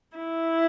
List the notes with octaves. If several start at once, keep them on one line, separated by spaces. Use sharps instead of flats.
E4